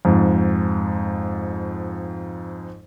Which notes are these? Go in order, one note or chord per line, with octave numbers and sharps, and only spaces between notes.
F2 G#2